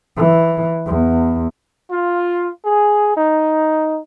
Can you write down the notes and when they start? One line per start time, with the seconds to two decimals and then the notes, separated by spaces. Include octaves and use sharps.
0.16 E3
0.86 E2
1.91 F4
2.65 G#4
3.16 D#4